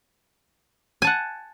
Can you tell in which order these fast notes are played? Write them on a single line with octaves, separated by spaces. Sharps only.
G#5 A5 F#5